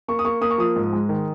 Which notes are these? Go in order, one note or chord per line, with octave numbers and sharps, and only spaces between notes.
A#3 C#6
D#6
A#3 C#6
A#3 D#6
C#6
F3 D#6
G#2
G#3
D#3